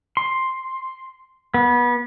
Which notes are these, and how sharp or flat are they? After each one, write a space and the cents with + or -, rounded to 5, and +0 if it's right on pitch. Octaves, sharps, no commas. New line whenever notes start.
C6 +5
B3 -25